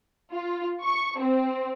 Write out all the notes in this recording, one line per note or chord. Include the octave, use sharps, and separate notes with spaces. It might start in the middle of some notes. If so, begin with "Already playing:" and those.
F4
C#6
C4